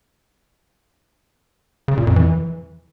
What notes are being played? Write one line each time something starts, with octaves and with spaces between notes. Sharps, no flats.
C#3
A#2
F2
E3